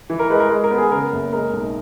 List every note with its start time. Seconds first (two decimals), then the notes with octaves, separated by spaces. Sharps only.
0.10 E3
0.19 A#4
0.30 G#3 B4
0.40 A#4
0.50 G#3
0.64 A#4
0.71 B3
0.78 G#4
0.91 C#3 A#4
1.12 F#1
1.33 G#3 A#4
1.53 B1